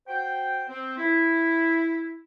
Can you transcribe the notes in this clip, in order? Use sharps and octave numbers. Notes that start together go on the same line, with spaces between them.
F#4 C5 G5
C4
E4